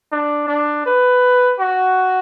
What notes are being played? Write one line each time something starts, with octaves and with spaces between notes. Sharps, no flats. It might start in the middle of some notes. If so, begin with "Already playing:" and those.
D4
D4
B4
F#4